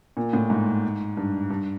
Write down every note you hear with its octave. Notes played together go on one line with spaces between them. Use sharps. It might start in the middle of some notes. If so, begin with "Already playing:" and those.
A#2
A2
G#2
G2
G2